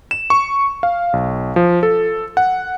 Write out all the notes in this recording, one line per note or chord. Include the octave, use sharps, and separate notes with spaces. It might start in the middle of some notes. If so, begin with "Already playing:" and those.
E7
C#6
F5
B1
F3
A4
F#5